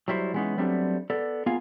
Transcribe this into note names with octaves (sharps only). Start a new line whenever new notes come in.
F#3 G3 E4 C5
E3 G#3 A3 B3 C#4 D#4
F#3 G3 A3 B3 C4 D4
B3 A4 D5
A#3 B3 F4 G#4 F5 G#5